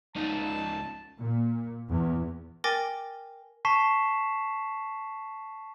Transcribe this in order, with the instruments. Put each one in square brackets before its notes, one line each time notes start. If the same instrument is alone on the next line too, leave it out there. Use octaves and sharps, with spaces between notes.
[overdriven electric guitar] C#2 D#4 [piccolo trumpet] A5
[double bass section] A#2
E2
[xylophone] A#4 G5 G#5 D6 A6 A#6
[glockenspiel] A5 C#6 B6 C7 E7